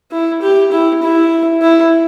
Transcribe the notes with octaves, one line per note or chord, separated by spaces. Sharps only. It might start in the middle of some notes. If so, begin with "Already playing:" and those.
E4
G4
E4
E4
E4